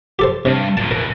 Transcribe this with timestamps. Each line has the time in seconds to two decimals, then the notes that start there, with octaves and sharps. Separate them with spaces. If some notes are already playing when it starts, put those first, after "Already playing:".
0.19 G4 A4 C5
0.45 G2 C3
0.77 D2 A#2 A5
0.91 B2 E3 A#4